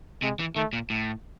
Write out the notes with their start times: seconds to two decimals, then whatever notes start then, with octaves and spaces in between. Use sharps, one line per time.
0.22 C3 G#3
0.39 E3
0.56 D#3 A3
0.73 A#2
0.90 A2